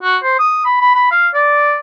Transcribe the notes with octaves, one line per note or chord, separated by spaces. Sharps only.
F#4
C5
D#6
B5
B5
B5
F5
D5